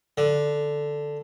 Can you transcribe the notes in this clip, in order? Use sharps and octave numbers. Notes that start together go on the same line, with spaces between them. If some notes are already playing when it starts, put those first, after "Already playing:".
D3